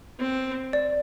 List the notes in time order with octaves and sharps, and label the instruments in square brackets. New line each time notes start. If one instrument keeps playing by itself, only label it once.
[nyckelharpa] C4
[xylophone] D5